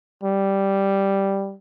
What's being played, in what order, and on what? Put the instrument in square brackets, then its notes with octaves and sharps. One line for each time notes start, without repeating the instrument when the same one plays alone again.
[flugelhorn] G3